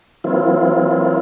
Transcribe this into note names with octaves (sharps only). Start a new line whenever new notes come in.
E3 F#3 A#3 C4 E4 F4